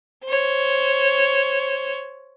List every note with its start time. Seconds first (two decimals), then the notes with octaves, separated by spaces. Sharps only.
0.24 C5 C#5